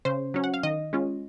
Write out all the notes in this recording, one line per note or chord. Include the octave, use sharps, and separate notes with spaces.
C#3 C5
F#3 C#4
F#5
F5
D#3 D#5
G#3 C#4 F4